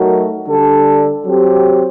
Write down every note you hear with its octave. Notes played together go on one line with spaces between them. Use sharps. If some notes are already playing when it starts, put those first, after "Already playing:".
Already playing: F#3 A3 D#4 F#4 A#4
D3 G3 D4 A4
F#3 C4 G4